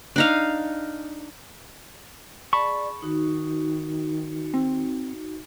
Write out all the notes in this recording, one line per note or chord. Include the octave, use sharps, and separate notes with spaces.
D4 D#4 F5
G#4 D5 A5 B5 C#6
D#3 D#4 F#4
C4